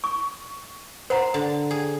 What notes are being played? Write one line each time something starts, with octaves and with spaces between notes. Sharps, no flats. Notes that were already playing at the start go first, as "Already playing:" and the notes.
C#6
C5 F#5 A#5 C6
D3
G#4